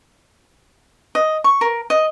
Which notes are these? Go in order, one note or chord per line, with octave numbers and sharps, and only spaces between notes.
D#5
C#6
A#4
D#5